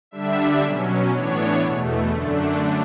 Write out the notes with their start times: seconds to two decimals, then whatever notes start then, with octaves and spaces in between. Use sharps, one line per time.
0.11 D3 G3 D4 E5
0.62 B2 F#3 C#4
1.10 A2 E3 B3 D4 C#5
1.61 E2 B2 A3
2.11 F#2 D3 A3 D4